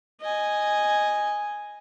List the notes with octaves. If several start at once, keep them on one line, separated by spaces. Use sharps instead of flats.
D#5 G#5